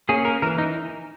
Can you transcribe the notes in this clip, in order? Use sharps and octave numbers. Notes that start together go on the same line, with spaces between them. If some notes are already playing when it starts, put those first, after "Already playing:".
A#3 C#4 G#4
A#4
E3 A#4
D#4